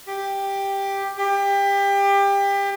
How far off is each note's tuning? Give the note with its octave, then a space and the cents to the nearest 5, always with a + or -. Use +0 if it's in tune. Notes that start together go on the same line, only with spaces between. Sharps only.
G4 +5
G4 +25